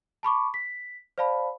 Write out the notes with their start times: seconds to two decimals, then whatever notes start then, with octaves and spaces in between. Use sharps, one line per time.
0.23 A5 B5 C#6 D6
0.54 B6
1.18 C5 D5 F5 A5 B5